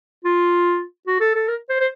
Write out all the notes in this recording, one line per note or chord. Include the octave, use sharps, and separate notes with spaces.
F4
F#4
A4
A4
A#4
C5
C5